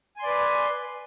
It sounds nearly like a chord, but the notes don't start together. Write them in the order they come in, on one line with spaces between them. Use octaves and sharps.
G#5 C6 D5 B4